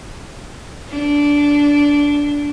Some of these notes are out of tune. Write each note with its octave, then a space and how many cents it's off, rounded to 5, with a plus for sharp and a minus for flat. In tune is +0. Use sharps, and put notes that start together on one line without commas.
D4 -15